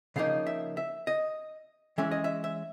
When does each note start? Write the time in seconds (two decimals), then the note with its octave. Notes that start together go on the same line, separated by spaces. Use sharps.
0.16 C#3 F3 A#3 D#4 F5
0.47 E5
0.77 E5
1.07 D#5
1.98 E3 G#3 C#4 E5
2.11 D#5
2.24 E5
2.44 E5